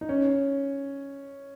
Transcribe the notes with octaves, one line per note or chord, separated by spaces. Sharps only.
D#4
C#4